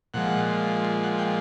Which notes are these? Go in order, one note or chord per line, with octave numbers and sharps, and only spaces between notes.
A#2 F3 G#3 F#5
F#5
G5